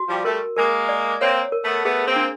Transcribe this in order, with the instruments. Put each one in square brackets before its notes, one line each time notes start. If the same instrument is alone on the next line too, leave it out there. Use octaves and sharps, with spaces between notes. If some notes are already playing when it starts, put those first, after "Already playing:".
Already playing: [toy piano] F#4
[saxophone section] F3 G3
[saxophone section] G3 A3 [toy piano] A#4
[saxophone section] G#3 A#3 [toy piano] A#4
[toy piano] D5
[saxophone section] A#3 C4 [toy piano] C#5
[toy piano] A#4
[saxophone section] A3 B3
[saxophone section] A3 B3 [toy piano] G#4
[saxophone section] A#3 C4
[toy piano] D4